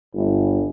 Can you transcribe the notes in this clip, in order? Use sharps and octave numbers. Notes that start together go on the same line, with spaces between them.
G1